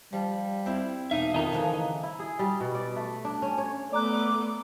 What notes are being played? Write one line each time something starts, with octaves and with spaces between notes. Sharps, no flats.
F3 G3
C4 E4 C5
E1 D#4 E5 F5
F2 D#3 D#5 A#5
C#3 E3 F3 A3 B3
E4
G#4
G3
B2
D5
A3
D4
C#4
C#5
A3 B3 D5 A#5 D6 F#6